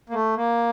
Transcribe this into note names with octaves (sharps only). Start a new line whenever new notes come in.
A#3
A3
A#3